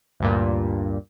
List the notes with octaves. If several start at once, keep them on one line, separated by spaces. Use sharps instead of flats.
D2 G2 A#2